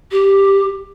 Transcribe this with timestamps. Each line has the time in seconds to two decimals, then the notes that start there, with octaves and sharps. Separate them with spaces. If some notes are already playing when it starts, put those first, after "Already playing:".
0.12 G4